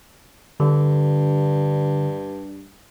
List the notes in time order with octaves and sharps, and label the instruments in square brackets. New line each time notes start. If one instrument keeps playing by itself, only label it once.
[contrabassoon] G2 [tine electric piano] D3